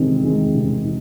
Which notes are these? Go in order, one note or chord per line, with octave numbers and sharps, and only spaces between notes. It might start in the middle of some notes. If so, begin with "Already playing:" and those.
Already playing: C3 D#3 G#3 C4 D#4
D#3 G#3 C4 D#4
C3
D#4